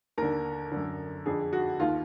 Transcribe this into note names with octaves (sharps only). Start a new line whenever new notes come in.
D#2 D3 A#4
F#2 D3
F2 D3 G#4
F#4
D#2 D#3 F4